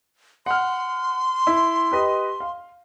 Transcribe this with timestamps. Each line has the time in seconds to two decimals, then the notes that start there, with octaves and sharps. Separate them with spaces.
0.46 F#5 C6 F6
1.47 E4
1.92 G4 B4 D#5
2.40 F5